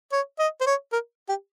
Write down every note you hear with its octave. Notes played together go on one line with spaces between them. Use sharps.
C#5
D#5
C5
C#5
A#4
G4